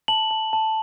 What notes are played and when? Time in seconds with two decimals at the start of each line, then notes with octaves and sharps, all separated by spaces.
0.08 A5 F#7
0.31 A5
0.53 A5